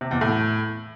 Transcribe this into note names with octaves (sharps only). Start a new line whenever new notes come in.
C3
E2
A2